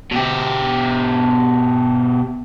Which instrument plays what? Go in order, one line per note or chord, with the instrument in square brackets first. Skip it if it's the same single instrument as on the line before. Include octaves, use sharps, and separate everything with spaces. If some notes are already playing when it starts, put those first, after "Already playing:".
[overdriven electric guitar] B2 G4